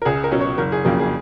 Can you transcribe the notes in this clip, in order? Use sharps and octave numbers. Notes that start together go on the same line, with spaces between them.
A#4
C#2 G#4
A#4
B2 F#3 C#4
C#5
F#1 A#4
G#4
F2 C#3 F#3 A#3
G#4